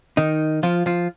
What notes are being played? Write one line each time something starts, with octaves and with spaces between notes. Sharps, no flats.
D#3 D#4
F3 F4
F3 F4